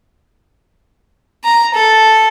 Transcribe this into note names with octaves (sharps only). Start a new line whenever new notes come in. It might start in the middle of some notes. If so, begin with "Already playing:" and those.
A#5
A4